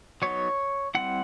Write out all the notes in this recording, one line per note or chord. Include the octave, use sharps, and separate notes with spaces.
F#3 B3 D#4 C#5
G3 C4 E4 F#5